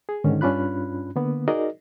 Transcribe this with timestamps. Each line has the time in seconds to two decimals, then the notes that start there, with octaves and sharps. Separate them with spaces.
0.09 G#4
0.24 G#2 D3 D#3 C#4
0.41 G2 C#4 D4 F4 B5 F#6
1.16 D3 A#3 B3
1.48 D#4 F#4 G#4 A#4 D5 D#5